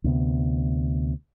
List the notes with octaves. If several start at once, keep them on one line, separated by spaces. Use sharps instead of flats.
D2 C3 B3